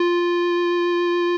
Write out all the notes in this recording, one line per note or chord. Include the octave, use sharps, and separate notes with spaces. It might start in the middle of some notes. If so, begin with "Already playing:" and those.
Already playing: F4